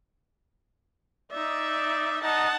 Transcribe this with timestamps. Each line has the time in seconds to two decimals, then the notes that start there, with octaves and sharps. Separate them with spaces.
1.32 D#4 D5 E5
2.24 D#4 F#5 A5